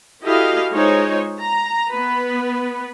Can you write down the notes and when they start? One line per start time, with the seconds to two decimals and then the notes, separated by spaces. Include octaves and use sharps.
0.23 E4 F#4 G4 A4 D#5 F5
0.73 G#3 D#4 F4 C5 C#5
1.40 A#5
1.90 B3 B4